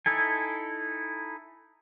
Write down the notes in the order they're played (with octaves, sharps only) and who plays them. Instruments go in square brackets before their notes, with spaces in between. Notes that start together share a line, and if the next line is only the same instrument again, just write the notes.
[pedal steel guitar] D#4 E4 A4 G#5